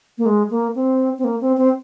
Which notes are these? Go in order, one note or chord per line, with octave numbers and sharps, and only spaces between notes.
A#3
G#3
A#3
C4
C4
A#3
C4
C4